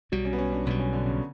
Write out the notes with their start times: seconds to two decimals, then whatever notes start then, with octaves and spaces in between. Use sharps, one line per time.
0.12 B1 B2 F#3 G3
0.25 C#4
0.33 B3
0.38 C#4
0.52 D4
0.66 B1 B2 G3 B3
0.80 C#4
0.93 D3
1.06 C#3